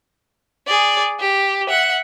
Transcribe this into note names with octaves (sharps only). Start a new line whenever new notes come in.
G#4 D5
G4
E5 F#5